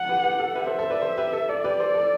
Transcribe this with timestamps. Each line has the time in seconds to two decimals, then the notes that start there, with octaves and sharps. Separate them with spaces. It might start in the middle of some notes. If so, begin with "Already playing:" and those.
Already playing: F#5
0.09 G4 B4
0.24 G4 B4
0.40 A4
0.55 G4 B4 E5
0.67 A4 C5
0.78 A4 C5
0.90 B4 D5
1.02 A4 C5
1.17 G4 B4
1.33 A4
1.48 A4 D5
1.64 G4 B4
1.80 A4 C5
1.95 A4